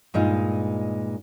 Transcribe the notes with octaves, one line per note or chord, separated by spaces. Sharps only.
G2 A#2 G#3 D#4